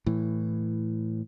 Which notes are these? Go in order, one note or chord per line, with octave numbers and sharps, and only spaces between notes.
A2 E3